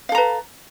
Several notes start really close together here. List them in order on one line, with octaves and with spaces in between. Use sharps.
F5 A4 A#5 B4